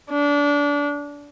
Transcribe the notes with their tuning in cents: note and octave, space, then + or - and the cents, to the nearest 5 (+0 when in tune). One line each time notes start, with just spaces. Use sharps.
D4 -25